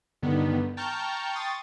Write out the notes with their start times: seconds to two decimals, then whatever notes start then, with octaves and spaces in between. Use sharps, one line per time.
0.22 G2 D3 D#3 B3
0.77 G5 A5 A#5 C#6 F6 G6
1.34 G5 C6 C#6 D#6 A6